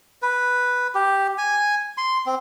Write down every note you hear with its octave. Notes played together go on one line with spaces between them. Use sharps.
B4
G4
G#5
C6
C4